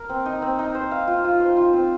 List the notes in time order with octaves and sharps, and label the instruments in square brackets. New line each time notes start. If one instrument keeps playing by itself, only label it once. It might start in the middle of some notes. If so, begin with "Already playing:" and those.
Already playing: [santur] A#4
C4
D#4
C4
D#4
C5
F5
F4
F4
C5
F4
C4